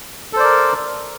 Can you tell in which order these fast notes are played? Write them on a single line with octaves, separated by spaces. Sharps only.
A4 C5 D5 A#4